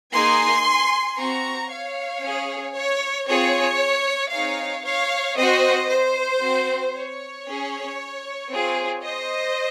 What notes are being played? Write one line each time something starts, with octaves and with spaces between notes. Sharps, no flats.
A#3 D#4 G#4 G#5 C6
C4 F#4 A#5 C#6
C#5 F5
C#4 G#4
C#5
C4 F4 G#4 C#5
C4 D#4 G#4 C#5 F5
C#5 F5
C4 F#4 C5 D#5
C5
C4 F#4
C#5
C#4 G#4
C4 F4 G#4
C5 D#5